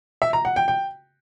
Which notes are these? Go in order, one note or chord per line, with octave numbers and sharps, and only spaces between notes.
E5
A#5
F#5
G5
G5